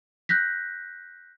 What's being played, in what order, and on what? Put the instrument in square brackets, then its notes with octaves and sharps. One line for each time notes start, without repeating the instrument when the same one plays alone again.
[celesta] F#6 G6 A#6 B6